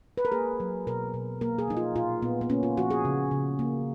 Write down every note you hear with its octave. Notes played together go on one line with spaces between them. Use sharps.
B4
A#4
A#3 G#4
F#3
B2 A#4
B2
A#3 A#4
G#4
F3 D#4
F4
A#2 F4
A#2 B3
B3
A#3 C#4
F4
F3 F#4
G#4
C#3
C#3
A#3